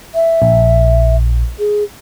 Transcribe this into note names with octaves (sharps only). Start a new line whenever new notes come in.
E5
A#1
G#4